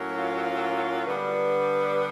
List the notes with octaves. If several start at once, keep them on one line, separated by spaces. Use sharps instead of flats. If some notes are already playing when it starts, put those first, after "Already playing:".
Already playing: A2 F#3 A#3 C#4
F4
D3 G3 B3 D4 B4